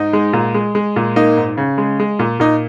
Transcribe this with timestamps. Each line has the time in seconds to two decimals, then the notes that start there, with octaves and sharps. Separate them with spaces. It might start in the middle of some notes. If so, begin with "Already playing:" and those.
Already playing: G#2 D#4
0.13 G#3
0.33 A#2
0.54 G#3
0.75 G#3
0.96 A#2
1.16 A#3 D#4
1.37 G#2
1.57 C#3
1.78 G#3
2.00 G#3
2.19 A#2
2.40 A#2 D#4